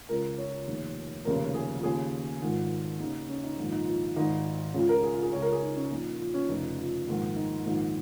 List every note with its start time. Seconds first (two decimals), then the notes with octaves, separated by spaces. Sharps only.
0.09 C#2 C#3 A#4
0.38 C#5
0.67 F1 D#2 D#3
1.25 F1 D#2 C#3 A#4
1.54 G#4
1.77 F4
1.83 D#2 C#3 G#4
2.42 G#1 G#2 D#3 F4
3.00 D#2 C#3 D#4
3.29 C#4
3.43 D#4
3.58 A#1 G#2 D#3 F4
3.72 D#4
3.85 F4
4.16 G#1 G#2 D#3 D#4
4.74 C#2 C#3 F4
4.89 A#4
5.03 G#4
5.13 F4
5.23 G#4
5.32 C#2 C#3 C#5
5.42 A#4
5.52 G#4
5.62 D#4
5.76 C#4
5.91 A#1 A#2 D#4
6.19 F4
6.34 C#4
6.48 F1 F2 C#3 D#4
6.78 F4
7.07 A#1 G#2 D#3
7.36 D#4
7.65 A#1 G#2 D#3